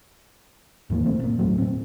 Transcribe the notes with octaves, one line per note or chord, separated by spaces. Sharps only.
D#2 G#2 E3 A#3
E1 C#2 A3 C4
A1 A#2
F#1 E2 F#3 A3
A2 C4